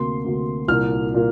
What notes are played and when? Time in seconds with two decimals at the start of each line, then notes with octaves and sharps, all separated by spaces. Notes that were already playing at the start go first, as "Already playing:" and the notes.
Already playing: D2 C3 A#3 C6
0.25 D2 C3 A#3
0.68 C2 A#2 A#3 F6
1.14 A#2 A#3